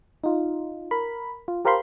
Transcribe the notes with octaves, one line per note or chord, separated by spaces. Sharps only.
D#4 F4
A#4 B5
F4
G4 A#4 C5 F5 B5 C6